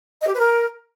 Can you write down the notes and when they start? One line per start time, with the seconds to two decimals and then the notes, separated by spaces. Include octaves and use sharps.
0.21 D#5
0.27 G4
0.33 B4
0.39 A#4